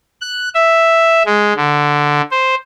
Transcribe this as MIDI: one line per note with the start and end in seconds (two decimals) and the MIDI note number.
0.21 0.49 90
0.55 1.23 76
1.26 1.53 56
1.56 2.21 50
2.31 2.55 72